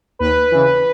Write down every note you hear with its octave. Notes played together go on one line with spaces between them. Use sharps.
D#2 B4
C#3 E3